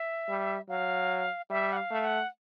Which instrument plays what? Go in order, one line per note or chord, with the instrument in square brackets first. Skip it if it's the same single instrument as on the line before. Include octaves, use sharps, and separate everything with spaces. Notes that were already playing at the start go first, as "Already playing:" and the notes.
Already playing: [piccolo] E5
[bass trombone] G3
[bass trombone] F#3 [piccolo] F5
[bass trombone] G3 [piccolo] E5
[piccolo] F#5
F5
[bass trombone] A3
[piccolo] F#5